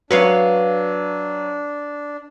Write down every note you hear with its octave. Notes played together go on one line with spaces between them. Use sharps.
F#3 D4 B4 C#5 F5